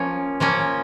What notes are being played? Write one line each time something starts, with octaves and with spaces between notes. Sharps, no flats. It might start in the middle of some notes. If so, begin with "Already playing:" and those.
Already playing: F3 A#3 C#4
F3 A#3 C#4